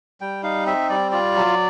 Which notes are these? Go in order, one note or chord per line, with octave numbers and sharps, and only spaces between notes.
G3 G5
D#4 F5
C4 E5
G3 D5
F4 D5
F#3